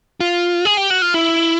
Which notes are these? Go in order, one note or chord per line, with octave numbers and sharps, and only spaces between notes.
F4
G#4
G4
F#4
F4
E4